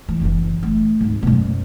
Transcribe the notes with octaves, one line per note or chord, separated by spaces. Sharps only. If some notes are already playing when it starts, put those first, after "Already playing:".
E3
F#1 E3
A3
G#1 D2
F#2 B2